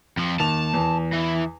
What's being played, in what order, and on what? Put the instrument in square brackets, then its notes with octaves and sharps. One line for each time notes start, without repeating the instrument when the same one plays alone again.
[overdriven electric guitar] F2 F3
[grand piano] D#2 F7 [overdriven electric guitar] A5
[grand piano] E2
[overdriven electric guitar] E3